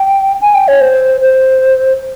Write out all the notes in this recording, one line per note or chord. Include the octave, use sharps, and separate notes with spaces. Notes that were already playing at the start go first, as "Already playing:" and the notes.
Already playing: G5
G#5
G5
C#5
C5
C5